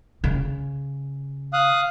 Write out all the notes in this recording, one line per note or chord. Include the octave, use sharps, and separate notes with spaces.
C#3
F5 D#6 F#6